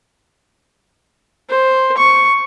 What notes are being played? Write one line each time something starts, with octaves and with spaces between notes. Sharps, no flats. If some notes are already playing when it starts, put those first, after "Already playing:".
C5
C#6